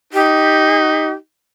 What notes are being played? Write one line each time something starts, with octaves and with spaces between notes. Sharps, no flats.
D#4 G4